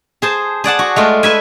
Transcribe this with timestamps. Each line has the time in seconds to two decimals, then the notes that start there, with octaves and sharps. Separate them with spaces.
0.22 G#4 C5 A5
0.64 G#4 D5 F#5 A5
0.79 F#4
0.96 G#3 A3 F4
1.23 B4 E5 G#5